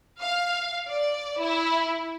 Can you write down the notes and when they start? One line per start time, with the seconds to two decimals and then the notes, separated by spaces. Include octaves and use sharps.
0.21 F5
0.88 D5
1.40 E4